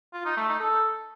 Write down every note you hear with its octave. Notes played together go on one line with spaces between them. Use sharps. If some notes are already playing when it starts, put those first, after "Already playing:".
F4
D#4
A3
D#4
A4